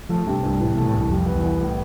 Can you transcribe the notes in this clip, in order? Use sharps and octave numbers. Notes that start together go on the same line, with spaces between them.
F3 A3
G2 C3
C2 G2
A2 E3
B2
A3
A2
C2 G2
F2 G3
B3
E2
E3
A2